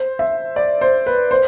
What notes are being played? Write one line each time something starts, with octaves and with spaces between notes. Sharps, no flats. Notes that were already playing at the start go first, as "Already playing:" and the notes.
Already playing: C5
E5
D5
C5
B4
C5